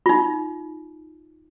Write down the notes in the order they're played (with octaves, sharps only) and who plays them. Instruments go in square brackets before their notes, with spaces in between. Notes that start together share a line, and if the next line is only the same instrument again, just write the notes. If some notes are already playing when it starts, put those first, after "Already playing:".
[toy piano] D#4 F4